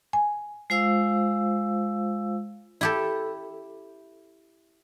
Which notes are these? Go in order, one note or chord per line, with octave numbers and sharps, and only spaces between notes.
G#5
G#3 F4 C5 F5 E6
E4 G4 A4